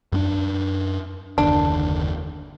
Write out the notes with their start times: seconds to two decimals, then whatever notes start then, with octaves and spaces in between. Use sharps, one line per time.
0.12 F#2 B3 D4
1.38 F#1 D#2 D3 D4